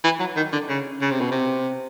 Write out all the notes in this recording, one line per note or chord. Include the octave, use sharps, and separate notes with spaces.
E3
F#3
D#3
D3
C#3
C#3
C3
B2
C3